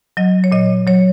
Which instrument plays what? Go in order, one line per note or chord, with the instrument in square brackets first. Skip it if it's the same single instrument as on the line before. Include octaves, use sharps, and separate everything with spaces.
[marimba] F#3 D#5
C#5
A#2 D#5
F#3 C#5